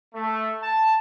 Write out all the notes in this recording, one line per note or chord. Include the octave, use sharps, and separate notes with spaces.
A3
A5